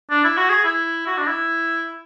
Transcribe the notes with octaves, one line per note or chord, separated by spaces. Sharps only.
D4
E4
F#4
G#4
E4
F#4
D4
E4